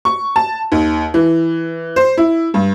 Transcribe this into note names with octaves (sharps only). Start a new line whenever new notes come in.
C#6
A5
D#2
E3
C5
E4
G2